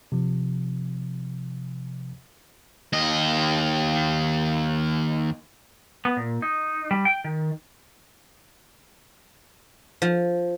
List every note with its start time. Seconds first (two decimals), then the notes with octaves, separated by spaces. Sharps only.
0.12 C3 F3
2.93 D#2 D#5
6.05 B3
6.17 A#2
6.42 D#4
6.91 G3
7.05 G5
7.24 D#3
10.02 F3